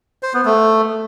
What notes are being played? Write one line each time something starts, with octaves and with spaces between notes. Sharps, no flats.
C5
B3
A3